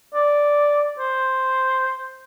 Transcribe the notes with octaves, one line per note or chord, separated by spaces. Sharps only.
D5
C5